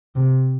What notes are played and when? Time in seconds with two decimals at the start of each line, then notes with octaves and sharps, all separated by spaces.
0.15 C3